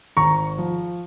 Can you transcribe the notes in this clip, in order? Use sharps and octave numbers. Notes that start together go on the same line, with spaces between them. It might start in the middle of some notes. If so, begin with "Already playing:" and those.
G#1 A#5 C#6
F3